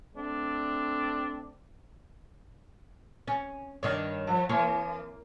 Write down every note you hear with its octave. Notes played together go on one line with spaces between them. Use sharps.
A3 C4 D4
C#4
G2 D#3 D4 C#5
F3
E3 A#3 C#5